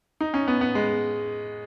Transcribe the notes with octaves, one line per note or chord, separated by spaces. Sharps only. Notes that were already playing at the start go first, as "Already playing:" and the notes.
D#4
C#4
B3
B3
G#3